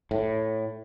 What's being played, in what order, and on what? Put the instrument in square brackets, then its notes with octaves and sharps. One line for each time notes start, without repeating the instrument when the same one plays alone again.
[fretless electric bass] A2